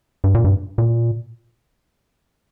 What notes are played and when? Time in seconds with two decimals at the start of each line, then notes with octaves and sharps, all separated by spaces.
0.24 G2
0.34 A#2
0.44 G2
0.78 A#2